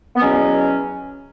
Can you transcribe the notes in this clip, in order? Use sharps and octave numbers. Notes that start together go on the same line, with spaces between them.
B3
E2 B2 F#3 C#4